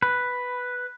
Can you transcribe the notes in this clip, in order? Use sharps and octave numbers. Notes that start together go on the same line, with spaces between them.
B4